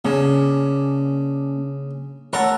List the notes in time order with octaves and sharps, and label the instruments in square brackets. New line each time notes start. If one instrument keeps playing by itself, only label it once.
[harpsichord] C#3 [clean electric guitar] A#3 C#4 D4
[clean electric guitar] A3 A4 A#4 [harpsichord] C#5 F#5